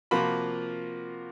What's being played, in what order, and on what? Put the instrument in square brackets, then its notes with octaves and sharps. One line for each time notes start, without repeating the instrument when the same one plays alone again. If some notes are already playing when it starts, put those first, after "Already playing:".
[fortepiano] C3 F3 A#3 F4 F#4 B5